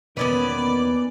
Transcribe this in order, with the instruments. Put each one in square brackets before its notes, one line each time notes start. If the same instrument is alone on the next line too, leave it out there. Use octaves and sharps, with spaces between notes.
[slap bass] E2 B2 A#3 [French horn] D#3 [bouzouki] B3 C#4 B4 [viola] D5